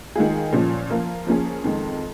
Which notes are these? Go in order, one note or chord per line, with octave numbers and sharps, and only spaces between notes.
D#3 G#3 F4 G#4
A#2 F3 C#4
F3 A#3 F4
F3 A#3 C#4 G#4
F2 D#3 G#3